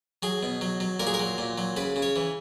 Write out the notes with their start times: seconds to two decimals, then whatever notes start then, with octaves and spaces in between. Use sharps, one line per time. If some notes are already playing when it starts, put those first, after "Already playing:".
0.23 F#3 G#4
0.43 B2
0.61 F#3
0.80 F#3
1.00 A#2 A#4
1.07 G#4
1.14 A#4
1.20 F#3
1.38 A#2
1.58 F#3
1.77 C#3 B4
1.96 C#3
2.02 C#5
2.16 E3